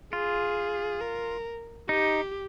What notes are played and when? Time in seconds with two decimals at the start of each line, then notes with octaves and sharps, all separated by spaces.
0.13 F4 G#4
1.01 A#4
1.89 D#4 G4